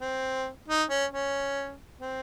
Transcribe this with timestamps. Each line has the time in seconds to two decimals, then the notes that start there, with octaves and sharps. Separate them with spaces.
0.01 C4
0.68 D#4
0.90 C#4
1.12 C#4
2.01 C4